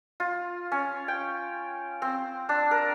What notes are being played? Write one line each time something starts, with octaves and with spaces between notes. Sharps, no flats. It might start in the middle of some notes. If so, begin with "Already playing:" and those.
F4
C#4
G5
C4
D4
A#4